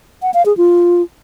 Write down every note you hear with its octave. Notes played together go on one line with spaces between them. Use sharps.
F#5
F5
G#4
F4